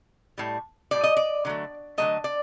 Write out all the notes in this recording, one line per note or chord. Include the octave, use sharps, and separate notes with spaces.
A2 G3
A2 G3 D5
D#5
D5
D3 F#3 A3
D3 F#3 A3 D#5
D5